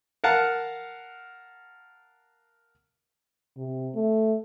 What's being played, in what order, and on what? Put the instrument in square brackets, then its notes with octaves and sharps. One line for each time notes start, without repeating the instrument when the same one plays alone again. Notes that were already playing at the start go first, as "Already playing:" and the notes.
[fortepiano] A#4 F5 F#5 A5
[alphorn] C3
A3